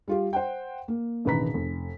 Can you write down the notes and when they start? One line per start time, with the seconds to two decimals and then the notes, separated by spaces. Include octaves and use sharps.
0.08 G3 F4 G4
0.33 C5 F#5 G5
0.88 A#3
1.25 E1 A1 D#3 B4 A#5 B6
1.54 F1